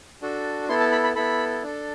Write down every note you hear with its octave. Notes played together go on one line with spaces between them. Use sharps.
D4 F#4 A4
B3 E4 A4 C6
A5
B5
B5
B3 E4 A4 B5
D4 A4